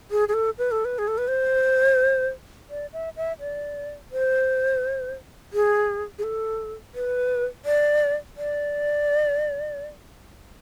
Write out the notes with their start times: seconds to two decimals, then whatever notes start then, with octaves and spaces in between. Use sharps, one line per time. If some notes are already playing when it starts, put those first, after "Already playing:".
0.11 G#4
0.28 G#4
0.34 A4
0.58 B4
0.71 A4
0.85 B4
0.98 G#4
1.08 A4
1.18 B4
1.28 C5
2.70 D5
2.93 E5
3.17 E5
3.40 D5
4.12 C5
5.53 G#4
6.19 G#4
6.23 A4
6.95 B4
7.65 D5
8.37 D5